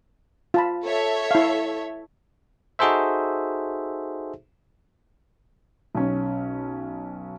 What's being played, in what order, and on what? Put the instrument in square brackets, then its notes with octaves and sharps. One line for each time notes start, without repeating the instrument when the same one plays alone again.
[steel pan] F4 A5 B5
[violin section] A4 C#5 E5
[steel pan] E4 F5
[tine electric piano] D#4 F#4 G#4 A4 C5 E5
[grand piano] B1 C#4